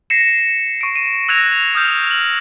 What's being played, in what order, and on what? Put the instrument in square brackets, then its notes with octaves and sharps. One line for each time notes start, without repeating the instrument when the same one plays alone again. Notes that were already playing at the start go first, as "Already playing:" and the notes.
[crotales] A#6 C7 C#7 E7
C#6 D7
D#7 E7
E6 F#6 G#6 A#6 F7
D#6 F6 G6 F7
F#7